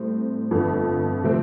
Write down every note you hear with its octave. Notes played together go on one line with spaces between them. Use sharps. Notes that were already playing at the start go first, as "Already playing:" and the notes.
Already playing: A2 G3 C4
G1 F2 D3
C3 F3 A3 C4